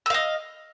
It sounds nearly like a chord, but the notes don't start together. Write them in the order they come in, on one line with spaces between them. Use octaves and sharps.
E6 F5 D#5